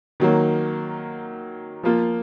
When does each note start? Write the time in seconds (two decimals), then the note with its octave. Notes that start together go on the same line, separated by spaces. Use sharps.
0.20 D#3 F#3 A#3
1.83 F3 A#3 F4